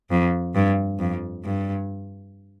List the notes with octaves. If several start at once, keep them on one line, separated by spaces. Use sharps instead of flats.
F2
G2
F2
G2